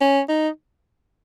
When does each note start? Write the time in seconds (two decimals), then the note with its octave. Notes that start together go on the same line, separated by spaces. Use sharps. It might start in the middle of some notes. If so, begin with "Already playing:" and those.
0.01 C#4
0.29 D#4